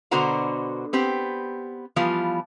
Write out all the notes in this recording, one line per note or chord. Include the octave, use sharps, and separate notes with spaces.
B2 D3 F#4 C5 F#5 A#5
B3 C4 G4
E3 F3 G3 B3 F4